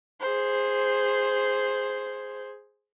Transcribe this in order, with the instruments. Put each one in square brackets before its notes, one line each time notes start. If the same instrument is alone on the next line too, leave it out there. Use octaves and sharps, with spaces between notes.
[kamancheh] G#4 C5